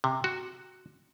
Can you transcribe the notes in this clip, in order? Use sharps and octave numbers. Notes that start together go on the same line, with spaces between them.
C3
F#4